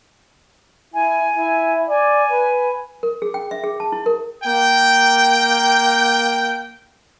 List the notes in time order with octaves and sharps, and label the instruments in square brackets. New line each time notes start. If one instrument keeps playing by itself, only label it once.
[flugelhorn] E4 [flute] G#5
[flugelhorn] E4
[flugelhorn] D5 [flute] G#5
[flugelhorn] B4
[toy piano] A#4
G#4
G5
E5
G#4
A5
E4
A#4
[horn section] A#3 G5